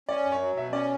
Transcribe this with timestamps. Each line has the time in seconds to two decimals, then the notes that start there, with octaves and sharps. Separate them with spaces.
0.09 C#4 D5
0.25 F#2
0.32 C#5
0.41 F#3
0.56 B2 E5
0.72 C#4 D5